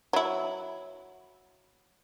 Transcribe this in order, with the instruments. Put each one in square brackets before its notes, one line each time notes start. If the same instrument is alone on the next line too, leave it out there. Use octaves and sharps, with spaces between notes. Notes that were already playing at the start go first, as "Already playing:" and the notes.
[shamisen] F#3 E4